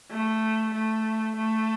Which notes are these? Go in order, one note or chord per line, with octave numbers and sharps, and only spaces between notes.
A3
A3
A3